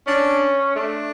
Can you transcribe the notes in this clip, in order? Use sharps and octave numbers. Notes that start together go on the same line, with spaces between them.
C#4 D4
A3 D4